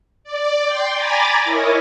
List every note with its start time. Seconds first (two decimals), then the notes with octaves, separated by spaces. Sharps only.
0.24 D5
0.66 G5 C6
0.95 G#5 A#5 B5 D6 A6
1.44 E4 A#4 C#5 D#5